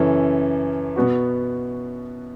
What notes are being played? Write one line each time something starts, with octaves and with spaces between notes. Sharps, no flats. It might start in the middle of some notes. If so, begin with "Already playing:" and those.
Already playing: F#2 C#3 E3 C#4 A4
B2 B3 F#4